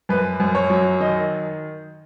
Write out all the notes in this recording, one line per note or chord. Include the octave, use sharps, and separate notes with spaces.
F#2 B4
F#2
C#5
F#3
D#3 D#5